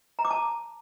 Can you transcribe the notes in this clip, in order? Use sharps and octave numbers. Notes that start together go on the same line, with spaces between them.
A#5
D6
A5